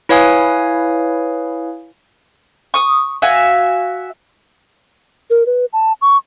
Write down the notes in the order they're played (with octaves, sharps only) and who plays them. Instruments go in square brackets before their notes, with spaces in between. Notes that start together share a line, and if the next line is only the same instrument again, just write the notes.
[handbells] E4 B4 C#5 F5 G#5 D#6
[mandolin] C#6 D#6
F#4 E5 F5 G#5
[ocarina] A#4
B4
A5
C#6